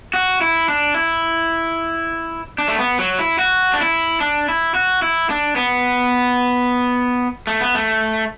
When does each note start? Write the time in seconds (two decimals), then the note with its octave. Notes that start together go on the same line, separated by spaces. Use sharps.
0.14 F#4
0.41 E4
0.68 D4
0.94 E4
2.58 D4
2.68 A3
2.78 B3
2.99 F#3
3.19 E4
3.39 F#4
3.73 D4
3.81 E4
4.20 D4
4.49 E4
4.75 F#4
5.02 E4
5.30 D4
5.56 B3
7.47 A3
7.61 B3
7.75 A3